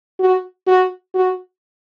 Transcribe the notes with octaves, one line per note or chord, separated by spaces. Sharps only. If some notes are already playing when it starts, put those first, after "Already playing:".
F#4
F#4
F#4